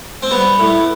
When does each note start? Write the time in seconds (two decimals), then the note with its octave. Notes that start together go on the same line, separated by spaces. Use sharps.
0.22 C4
0.31 G3 B3
0.59 A2